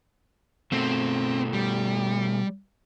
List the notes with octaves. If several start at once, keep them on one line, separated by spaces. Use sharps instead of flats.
B2 A3 C4
G3